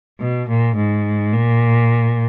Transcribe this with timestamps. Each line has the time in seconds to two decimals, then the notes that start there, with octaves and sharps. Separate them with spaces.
0.19 B2
0.49 A#2
0.76 G#2
1.33 A#2